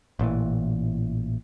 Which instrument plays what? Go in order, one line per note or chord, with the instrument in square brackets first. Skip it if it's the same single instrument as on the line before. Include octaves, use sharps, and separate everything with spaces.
[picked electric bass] A1 A#2 E3